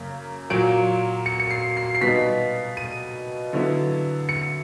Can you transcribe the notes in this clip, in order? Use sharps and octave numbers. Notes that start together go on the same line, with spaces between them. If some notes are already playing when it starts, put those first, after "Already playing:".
Already playing: F#2 C#3 A#3
A#2 F#3 A#3 D7
C#7
C#7
C7
C7
C7
B2 G3 B3 D#4 B6
D#7
D3 F#3 B3 E4
C#7